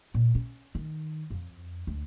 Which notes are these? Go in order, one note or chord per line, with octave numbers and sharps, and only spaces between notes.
A#2
C#4
D#3
F2
D2